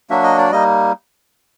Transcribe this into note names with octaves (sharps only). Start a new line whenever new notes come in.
F#3 A#3 D4 F#4 E5
D#5
D5
G3 A#3 D#4 D#5